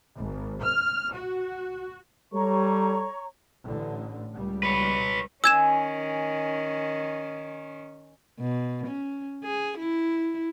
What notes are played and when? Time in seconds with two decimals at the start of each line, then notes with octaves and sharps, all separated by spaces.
0.17 G#1
0.62 F6
1.13 F#4
2.34 G3 A4 C#5 A#5 C#6
3.65 A1 A2 D3
4.33 C#2 G3
4.63 B4 C#5
5.44 D#3 C#4 G#5 E6 G#6 E7
8.40 B2
8.87 C#4
9.43 G#4
9.79 E4